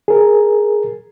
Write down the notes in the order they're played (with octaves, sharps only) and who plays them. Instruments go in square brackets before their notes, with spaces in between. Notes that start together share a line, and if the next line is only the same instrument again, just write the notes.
[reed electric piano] G#4 A#4